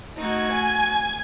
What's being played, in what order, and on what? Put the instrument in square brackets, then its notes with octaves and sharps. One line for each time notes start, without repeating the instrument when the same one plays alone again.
[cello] A3 F#4 [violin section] D#4 [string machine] G#6
[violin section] G#5